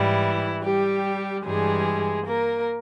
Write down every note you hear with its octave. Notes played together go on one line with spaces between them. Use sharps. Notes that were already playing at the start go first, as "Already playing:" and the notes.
Already playing: G#2 E3 G3 E4
G3 G4
G2 E3 G3 G#3 G#4
A#3 A#4